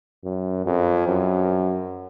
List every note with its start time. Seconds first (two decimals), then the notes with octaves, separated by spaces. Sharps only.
0.24 F#2
0.66 F2
1.08 F#2